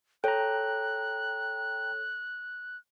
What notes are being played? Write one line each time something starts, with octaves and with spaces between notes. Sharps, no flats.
A4 C#5 G5 A#5 F#6